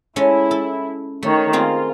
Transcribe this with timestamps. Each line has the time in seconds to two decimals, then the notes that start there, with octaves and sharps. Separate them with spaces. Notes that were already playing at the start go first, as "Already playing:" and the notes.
0.16 G#3 C#4 E4 A4
0.51 A4
1.23 D#3 A3 C#5
1.53 A#3 C4 F4 G#4